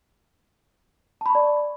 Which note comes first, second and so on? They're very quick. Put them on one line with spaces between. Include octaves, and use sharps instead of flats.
A5 B5 C#6 D5